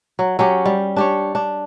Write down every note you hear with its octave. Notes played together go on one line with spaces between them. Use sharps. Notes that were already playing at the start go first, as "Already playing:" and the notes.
F#3
F#3 C#4 G4
G3
D4 G4 C#5
D4